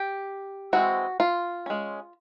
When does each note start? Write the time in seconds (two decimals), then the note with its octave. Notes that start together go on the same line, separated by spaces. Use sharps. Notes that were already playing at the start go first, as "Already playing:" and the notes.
Already playing: G4
0.73 E3 G#3 C4 F#4
1.20 F4
1.66 G#3 C#4